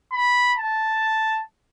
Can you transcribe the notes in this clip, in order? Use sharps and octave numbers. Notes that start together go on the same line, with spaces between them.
B5
A5